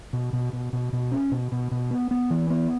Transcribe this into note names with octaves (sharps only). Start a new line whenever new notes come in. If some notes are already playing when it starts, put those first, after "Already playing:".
B2
B2
B2
B2
B2
C#4
B2
B2
B2
B3
B3
E3
B3